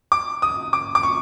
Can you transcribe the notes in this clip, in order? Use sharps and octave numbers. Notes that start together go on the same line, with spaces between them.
D6
D#6
D6
D6
C#6